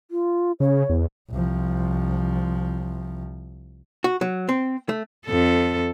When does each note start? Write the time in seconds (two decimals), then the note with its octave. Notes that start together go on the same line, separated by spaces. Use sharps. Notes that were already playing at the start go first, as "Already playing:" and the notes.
0.11 F4
0.60 C#3 C#5
0.89 E2
1.31 C2 F3
4.04 F#4
4.21 F#3
4.49 C4
4.89 A3
5.26 F2 A4